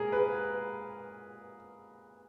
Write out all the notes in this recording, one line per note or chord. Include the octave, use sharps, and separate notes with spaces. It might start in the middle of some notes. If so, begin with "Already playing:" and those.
Already playing: A#2 G#3 G#4 A#4
B4